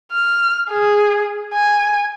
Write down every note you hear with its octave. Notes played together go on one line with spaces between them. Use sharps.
F6
G#4
G#5